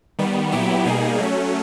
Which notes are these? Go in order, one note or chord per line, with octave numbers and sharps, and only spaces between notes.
D#3 G3 B3
A#2 F#3 B3 E4 G4
B2 G3 A#3 D#4 G#4
F#3 A3 C#4